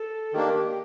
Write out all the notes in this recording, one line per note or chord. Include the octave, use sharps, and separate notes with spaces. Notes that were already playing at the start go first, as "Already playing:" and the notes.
Already playing: A4
D#3 A#3 D4 G4
G4